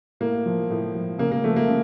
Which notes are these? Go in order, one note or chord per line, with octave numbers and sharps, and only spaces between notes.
A2 A#3
F3
A2
F3
C#3 A#3
A#3
F3 A3
A#3
C#3